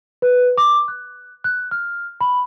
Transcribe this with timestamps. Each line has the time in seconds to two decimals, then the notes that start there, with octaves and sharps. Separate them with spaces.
0.22 B4
0.58 D6
0.88 F#6
1.44 F#6
1.71 F6
2.21 B5